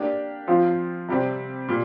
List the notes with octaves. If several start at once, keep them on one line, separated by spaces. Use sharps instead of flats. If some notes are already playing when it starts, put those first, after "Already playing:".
Already playing: A#3 D4 G4 D5
F3 C4 F4 C5
C3 G3 C4
A#2 G3